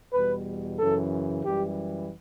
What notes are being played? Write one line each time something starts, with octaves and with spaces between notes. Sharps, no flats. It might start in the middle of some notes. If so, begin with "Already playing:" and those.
E2 B2 G3 B4
F#2 C#3 E3 A4
F#2 E3 G3 G4